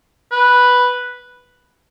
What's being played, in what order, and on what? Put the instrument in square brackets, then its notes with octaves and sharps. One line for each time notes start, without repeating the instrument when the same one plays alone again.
[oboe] B4